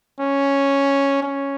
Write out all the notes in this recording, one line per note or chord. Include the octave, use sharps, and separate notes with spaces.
C#4
C#4